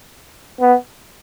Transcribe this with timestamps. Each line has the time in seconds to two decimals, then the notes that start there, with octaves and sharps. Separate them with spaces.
0.61 B3